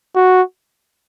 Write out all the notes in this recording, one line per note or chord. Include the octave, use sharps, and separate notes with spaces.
F#4